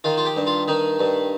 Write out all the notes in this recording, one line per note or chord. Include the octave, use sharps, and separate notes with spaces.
D#3 F4
F4
G4
G2
F4
D#3 D#4
G2